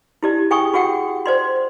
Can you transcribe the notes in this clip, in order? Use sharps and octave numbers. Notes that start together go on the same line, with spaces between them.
E4 G4 D5
G#4 G5 G#5 C#6 D#6
F#4 G#4 F#5 G5
C5 D5 C6